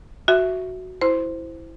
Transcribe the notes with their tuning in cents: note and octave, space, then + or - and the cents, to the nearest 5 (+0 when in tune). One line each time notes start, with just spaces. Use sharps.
F#4 +0 E5 +0
E4 +0 C5 -10 C6 +0